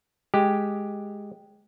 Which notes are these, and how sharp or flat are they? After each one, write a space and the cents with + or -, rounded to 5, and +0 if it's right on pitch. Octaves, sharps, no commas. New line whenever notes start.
G#3 +0 G4 +0